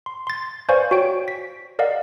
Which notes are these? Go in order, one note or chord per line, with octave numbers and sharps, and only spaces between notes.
C6
C6 A6
B4 C5 D5 F5 G#5 C#6
F#4 C#5 G5 D7
B6
A#4 D5 D#5 F5 F#5